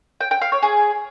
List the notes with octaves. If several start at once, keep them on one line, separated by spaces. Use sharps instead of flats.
G5
G5
F5
C#5
G#4